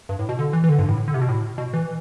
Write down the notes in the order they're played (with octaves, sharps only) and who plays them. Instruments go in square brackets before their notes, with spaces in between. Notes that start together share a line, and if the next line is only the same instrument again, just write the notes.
[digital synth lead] G2
A2
B2
D3
E3
E3
D3
G2
A2
D3
C3
B2
A2
B2
E3